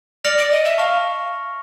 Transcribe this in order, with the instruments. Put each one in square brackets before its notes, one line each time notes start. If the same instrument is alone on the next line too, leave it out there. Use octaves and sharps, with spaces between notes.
[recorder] D5 [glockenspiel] F6 A#6 C#7 F7
[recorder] D5
D#5
E5
[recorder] F5 [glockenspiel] A5 C#6 F6